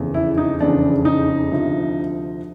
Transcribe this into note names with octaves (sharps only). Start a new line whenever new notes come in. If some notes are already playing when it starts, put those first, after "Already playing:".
Already playing: F1 E2 C#3
E4
D#4
F1 E2 C#3 D4
D#4
D2 C3 F3